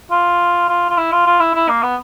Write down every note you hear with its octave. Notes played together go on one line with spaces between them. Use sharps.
F4
F4
F4
E4
F4
F4
E4
E4
A#3
B3